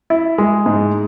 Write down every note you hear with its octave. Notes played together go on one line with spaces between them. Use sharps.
E4
G#3
G#2